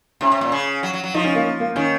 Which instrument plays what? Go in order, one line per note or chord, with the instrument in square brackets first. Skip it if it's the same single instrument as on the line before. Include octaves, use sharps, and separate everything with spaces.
[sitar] C3 [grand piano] C#4
[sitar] C3
A#2
C#3
F#3
F#3
F#3
[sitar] F3 [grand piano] D#4
[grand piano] C#4
A#3
A#3
[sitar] D#3 [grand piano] C#4